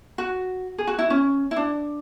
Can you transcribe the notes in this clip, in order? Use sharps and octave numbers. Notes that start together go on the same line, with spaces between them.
F#4
G#4
F#4
E4
C#4
E4
D4